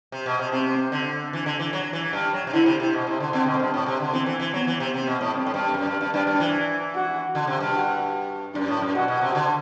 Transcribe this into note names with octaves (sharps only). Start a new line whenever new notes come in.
C3
B2
C3
C3 C4
D3
E3
D3
E3
F#3
E3
G2
F#3
C3
D3 E4
C3
C3
B2
C3
D3
D3 C4
B2
G2
A2
C3
D3
E3 C4
E3
E3
F#3 B3
E3
C3
C3 C4
B2
A2
G2 C4
A2
G2
F#2
G2
G2
G2 D4
G2
E3
F#4
D3
C3
G2
F#4
F#2 D4
A2
F#2
B2 F#4
B2
C3
D3